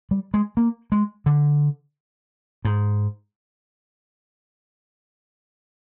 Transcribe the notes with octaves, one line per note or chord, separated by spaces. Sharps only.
G3
G#3
A#3
G#3
D3
G#2